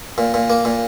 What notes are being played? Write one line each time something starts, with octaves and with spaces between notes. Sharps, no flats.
A#2
A#2
A#3
A#2